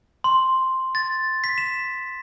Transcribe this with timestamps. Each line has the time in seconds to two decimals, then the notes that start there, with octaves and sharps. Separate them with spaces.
0.24 C6
0.95 A6
1.44 B6
1.58 E7